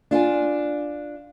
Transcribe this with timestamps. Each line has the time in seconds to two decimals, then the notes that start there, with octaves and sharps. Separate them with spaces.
0.11 D4 F4 G5 G#5